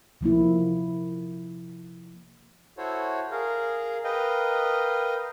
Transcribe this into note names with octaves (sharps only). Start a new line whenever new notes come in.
C3 F3 A#3 E4
E4 F#4 A4 C5 C#5
G#4 A#4 F5
A#4 B4 D#5 F5 G5